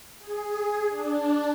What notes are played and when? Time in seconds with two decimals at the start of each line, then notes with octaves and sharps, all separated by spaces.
0.19 G#4
0.89 D4